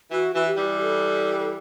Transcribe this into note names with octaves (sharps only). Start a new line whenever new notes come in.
E3 F#4
E3 F#4
G4
E3 G3
A4
A4